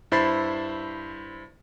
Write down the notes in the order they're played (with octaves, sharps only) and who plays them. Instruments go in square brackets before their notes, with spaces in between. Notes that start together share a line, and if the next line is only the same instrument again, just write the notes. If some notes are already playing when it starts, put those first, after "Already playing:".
[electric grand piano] G2 E4 C5 B5 A6 C7